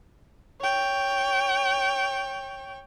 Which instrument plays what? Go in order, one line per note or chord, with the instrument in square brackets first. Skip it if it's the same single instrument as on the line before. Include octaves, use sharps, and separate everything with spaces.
[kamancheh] C#5 G5